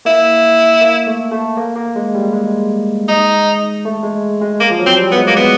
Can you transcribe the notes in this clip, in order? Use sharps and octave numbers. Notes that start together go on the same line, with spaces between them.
A#3 E4
A#3
A3
A3
A#3
A#3
G#3
G3
G#3
D#4
A3
G#3
G#3
A#3
F3
F#3
C4
G3
B3
G#3
A#3
B3